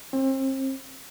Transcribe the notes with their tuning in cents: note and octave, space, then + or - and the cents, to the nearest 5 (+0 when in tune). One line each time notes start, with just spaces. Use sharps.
C4 +35